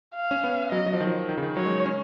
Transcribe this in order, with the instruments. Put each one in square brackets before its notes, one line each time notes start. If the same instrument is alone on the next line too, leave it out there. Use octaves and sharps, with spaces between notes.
[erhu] F5
[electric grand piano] C#4
B3
[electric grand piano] F#3 [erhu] D#5
[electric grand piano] F#3
F3
D#3
F3
D#3
C#3
D#3
[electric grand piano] F#3 [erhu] C#5
[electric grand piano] G#3
C#4